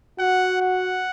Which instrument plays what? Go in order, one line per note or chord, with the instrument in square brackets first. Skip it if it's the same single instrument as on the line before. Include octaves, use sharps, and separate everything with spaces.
[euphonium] F#4 [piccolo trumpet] F#5
[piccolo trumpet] F#5